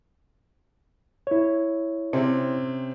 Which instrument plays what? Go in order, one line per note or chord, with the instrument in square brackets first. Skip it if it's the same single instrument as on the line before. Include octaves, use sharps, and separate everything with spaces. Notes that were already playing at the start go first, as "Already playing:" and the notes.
[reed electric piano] E4 C#5
[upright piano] C3 C4 C#4